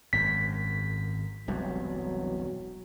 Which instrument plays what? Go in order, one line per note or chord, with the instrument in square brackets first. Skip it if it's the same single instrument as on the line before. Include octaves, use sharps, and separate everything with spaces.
[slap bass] G#1 F#2 [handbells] B6
[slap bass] E1 C2 G2 [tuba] F#3